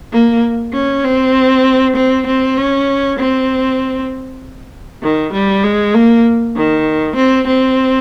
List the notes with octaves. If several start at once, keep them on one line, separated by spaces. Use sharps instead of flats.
A#3
C#4
C4
C4
C4
C#4
C4
D#3
G3
G#3
A#3
D#3
C4
C4